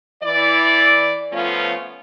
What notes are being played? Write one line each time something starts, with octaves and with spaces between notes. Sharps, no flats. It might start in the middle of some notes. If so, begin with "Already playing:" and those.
E3 E4 D5
F3 A3 B3 C#4 F4